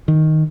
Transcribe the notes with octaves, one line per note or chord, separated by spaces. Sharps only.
D#3